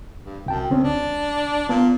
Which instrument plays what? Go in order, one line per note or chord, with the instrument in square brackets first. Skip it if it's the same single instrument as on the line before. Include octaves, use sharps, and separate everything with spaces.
[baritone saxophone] G2
[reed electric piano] C2 G5 A5 [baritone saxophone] F#2
[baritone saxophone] B2 [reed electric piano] D3 C4 C#4
[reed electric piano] C#2 [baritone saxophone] D4
[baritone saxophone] A#2 [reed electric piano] B3 A5